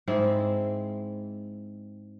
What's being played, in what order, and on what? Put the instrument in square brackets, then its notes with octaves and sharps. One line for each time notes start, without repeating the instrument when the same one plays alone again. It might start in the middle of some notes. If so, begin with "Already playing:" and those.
[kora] G#2 G#3 C4 E4